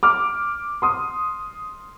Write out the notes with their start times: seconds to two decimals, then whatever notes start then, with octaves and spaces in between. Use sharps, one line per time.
0.03 D6 F6
0.82 C6 D#6